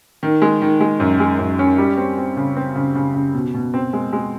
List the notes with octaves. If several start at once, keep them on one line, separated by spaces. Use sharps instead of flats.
D#3
G#3
D#3
G#3
F#2
G#3
F#2
C#4
G3
C4
C4
C#3
C4
C#3
C#3
C#3
B2
B2
C4
G#3
G#3